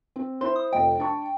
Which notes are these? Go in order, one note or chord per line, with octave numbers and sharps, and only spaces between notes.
C4
E4 C5 C6
D#6
F1 F2 D#5 G5
D4 A5 C#6